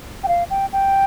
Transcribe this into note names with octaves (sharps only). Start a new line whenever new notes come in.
G5
F5
G5
G5